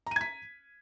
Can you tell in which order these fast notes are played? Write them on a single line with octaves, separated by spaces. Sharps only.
A#5 D#7 G#6 B6